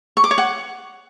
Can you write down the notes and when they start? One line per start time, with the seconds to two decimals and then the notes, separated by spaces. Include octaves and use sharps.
0.17 C#6
0.24 D6
0.31 C#5
0.38 F#5